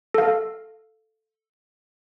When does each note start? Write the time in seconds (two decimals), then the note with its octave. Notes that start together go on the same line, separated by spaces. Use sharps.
0.14 A4 F5